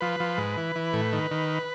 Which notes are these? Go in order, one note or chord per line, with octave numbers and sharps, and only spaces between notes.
F3 B4
F3
G#2
E3
E3
A2
D#3
D#3